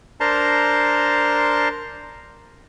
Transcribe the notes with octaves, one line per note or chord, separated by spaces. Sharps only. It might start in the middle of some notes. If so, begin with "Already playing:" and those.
D4 A#4 C5 A5 A#5 C6